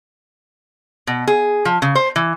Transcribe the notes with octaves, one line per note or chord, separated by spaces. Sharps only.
B2
G#4
F3
C#3
C5
E3